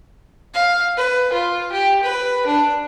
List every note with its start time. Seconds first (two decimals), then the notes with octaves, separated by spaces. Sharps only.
0.54 F5
0.97 B4
1.33 F4
1.72 G4
2.03 B4
2.46 D4